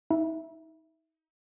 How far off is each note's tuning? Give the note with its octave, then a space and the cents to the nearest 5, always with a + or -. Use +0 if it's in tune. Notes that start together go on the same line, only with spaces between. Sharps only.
D#4 +40 E5 +0